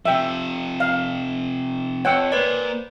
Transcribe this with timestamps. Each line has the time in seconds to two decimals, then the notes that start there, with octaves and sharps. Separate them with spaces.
0.05 C3 F3 E5 G5
0.80 F5
2.05 F2 C#5 F#5 G5 E6
2.32 A#3 B4 C5 D5 G#5